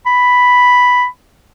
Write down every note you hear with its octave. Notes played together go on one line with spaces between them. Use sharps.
B5